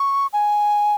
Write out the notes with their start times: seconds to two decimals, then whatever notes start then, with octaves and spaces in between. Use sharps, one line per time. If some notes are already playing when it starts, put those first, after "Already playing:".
Already playing: C#6
0.33 G#5